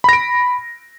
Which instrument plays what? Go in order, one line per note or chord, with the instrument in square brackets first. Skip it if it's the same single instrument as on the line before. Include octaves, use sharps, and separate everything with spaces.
[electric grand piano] B5
A#6
D7